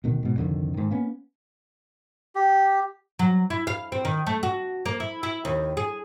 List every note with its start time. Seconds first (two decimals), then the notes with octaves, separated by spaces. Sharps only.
0.04 D2 B2 D#3
0.23 G#2 B2
0.36 C2 F2 D3 D#3
0.74 G#2 D#3
0.91 A#3 B3 C#4
2.35 G4
3.19 F#3
3.50 E4
3.67 F5
3.92 C4
4.05 D#3
4.27 A3
4.43 F#4
4.85 A#3
5.00 E4
5.23 E4
5.45 D#2
5.77 G#4